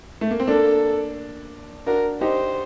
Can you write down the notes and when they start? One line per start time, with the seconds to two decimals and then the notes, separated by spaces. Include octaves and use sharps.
0.21 A3
0.31 A#3
0.40 C4
0.48 A#3 D4 A4
1.86 D4 F#4 A#4
2.21 D#4 G4 C5